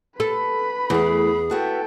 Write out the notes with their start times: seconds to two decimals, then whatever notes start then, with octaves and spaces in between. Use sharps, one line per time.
0.20 A4 B4 B5
0.90 E2 E3 A3 G#4
1.50 B3 F#4 A4 E5 G5